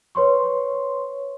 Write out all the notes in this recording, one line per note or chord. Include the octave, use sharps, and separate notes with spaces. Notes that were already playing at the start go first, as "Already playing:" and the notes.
B4 C#5 C6 C#6